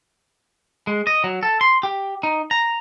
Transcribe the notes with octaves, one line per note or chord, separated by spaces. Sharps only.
G#3
D#5
F#3
A4
C6
G4
D#4
A#5